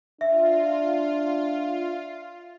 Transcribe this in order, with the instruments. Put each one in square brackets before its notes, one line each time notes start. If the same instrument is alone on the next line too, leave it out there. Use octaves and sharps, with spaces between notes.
[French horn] D4 [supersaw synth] F4 [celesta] E5